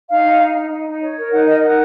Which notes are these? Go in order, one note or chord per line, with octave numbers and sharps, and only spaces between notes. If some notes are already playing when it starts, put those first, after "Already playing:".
D#4 F5
D#4
D#4
D#4
D#4
D#4
C#5
A#4
D#4 F#5
A#4 D#5
D#4 F#5